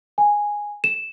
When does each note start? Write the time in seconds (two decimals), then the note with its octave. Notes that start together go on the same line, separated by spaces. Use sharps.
0.18 G#5
0.84 E7